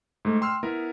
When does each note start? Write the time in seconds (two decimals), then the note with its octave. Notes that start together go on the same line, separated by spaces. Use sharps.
0.25 G#2 A3
0.41 G5 C6 E6 F6
0.63 B3 E4 A#4